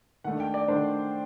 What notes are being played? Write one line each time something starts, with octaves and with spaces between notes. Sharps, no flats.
D#3 A3 D4 F#5
G5
D5
D#3 A3 D4 C5